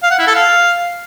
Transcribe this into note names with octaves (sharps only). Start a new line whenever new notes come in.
F5
F#5
E4
A4
F5